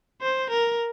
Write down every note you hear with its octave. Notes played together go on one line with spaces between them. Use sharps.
C5
A#4